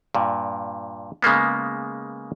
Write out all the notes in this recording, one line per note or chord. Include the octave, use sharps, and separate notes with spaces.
G2 A#2
C#3 G#3 A#3 B3